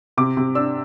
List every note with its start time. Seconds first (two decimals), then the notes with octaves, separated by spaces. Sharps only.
0.17 C3 D6
0.37 C3
0.55 D4 E6